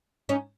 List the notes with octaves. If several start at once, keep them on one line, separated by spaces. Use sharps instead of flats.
C#4 D#4